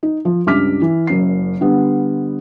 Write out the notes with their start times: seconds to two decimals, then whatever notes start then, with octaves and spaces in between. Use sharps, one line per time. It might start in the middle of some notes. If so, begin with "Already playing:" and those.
0.03 D#4
0.25 F3
0.46 C#2 G2 D6 F6 B6
0.82 E3
1.07 F#1 F#2 C7
1.61 D3 G3 B3